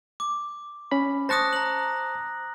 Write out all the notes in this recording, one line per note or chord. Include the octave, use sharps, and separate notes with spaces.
D6
C#4 B5
C5 A5 C#6 D#6 F#6 A#6
A#5 F#7